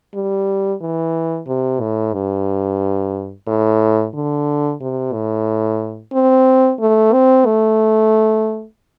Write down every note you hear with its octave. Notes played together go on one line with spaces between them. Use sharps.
G3
E3
C3
A2
G2
A2
D3
C3
A2
C4
A3
C4
A3